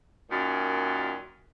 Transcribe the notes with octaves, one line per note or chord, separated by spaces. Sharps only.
F#2 A#2 D#3